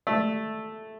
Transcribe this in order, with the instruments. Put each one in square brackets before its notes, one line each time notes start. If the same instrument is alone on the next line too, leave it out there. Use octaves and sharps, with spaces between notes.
[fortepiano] A3